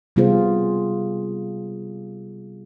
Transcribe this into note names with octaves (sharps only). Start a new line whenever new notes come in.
C3 G3 B3 F4 G#4 C5